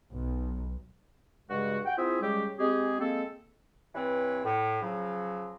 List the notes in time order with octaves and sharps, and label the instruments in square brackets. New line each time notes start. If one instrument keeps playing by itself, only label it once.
[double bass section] B1
[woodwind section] G2 C#3 G#3 F#4
F#5 G5
C4 E4 F4 G#4 E5
C#3 G3 G#3 G4
G#3 C4 G4 G#4
G#3 A#3 C4 A4
G2 E3 C4 B4 C#5
A2
C#3 F3 F#3